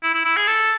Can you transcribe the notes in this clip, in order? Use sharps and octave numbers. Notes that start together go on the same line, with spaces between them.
E4
E4
E4
G#4
A4